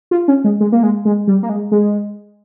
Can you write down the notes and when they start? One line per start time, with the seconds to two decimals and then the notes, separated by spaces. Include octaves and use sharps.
0.11 F4
0.28 C#4
0.44 G#3
0.60 G#3
0.72 A#3
0.83 G#3
1.05 G#3
1.27 G3
1.43 A#3
1.49 G#3
1.72 G#3